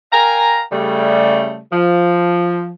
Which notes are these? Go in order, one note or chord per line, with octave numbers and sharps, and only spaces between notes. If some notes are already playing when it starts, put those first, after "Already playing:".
A#4 F5 G5 G#5 A#5
C#3 G3 A3
F3